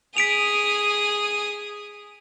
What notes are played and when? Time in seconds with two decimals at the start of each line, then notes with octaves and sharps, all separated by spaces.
0.17 G#4 D#6 B6 D7 F7